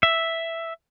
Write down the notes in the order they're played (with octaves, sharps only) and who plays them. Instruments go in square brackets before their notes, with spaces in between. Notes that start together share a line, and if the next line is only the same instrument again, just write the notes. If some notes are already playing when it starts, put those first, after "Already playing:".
[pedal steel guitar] E5